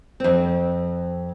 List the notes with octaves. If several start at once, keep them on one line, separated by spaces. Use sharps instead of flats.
F2 C4